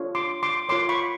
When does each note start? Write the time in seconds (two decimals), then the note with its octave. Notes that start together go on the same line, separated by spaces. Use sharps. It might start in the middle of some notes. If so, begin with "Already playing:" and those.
Already playing: D4 F4 A4 C#5
0.15 C6 D6
0.43 C6 D6
0.69 F4 A#4 C#5 C6 D6
0.89 B5 C#6